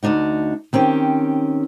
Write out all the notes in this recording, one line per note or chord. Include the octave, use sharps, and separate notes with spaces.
D2 C3 D4 D#4 F#4
D#3 C4 C#4 G4